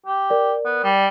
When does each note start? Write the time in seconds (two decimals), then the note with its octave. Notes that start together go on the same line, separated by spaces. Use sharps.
0.07 G4
0.30 A#4 D5
0.66 B3
0.84 G3